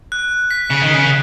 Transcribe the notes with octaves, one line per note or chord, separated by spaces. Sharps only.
F#6
B6
C#3
D#3
C#3